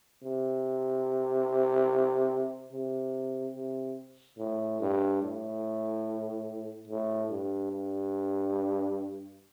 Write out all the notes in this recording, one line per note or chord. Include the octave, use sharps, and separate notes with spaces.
C3
C3
C3
A2
G2
A2
A2
G2
G2